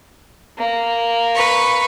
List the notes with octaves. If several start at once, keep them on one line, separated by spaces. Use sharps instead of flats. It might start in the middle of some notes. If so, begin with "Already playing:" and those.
A#3
B4 C#6